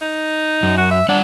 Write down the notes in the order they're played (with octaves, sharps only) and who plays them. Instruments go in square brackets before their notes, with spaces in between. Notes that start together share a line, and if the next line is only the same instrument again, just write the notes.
[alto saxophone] D#4
[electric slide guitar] F#2
[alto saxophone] F#4
E5
[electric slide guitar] G3 F#5 [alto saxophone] D4